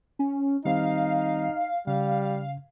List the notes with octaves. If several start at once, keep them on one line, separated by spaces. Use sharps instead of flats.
C#4
D#3 G3 C4 D#4 F5
C#3 G3 F5